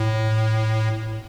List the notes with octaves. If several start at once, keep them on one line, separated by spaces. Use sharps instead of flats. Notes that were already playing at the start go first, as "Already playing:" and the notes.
Already playing: A2